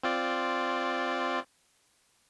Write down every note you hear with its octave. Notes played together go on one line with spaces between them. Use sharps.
C4 F4 D5